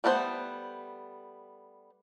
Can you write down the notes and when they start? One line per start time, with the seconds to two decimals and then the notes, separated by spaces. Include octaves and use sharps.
0.04 G3 A3 B3 F4 C5